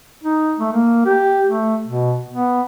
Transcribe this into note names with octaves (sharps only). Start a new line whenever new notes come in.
D#4
A3
A#3
G4
A3
B2
B3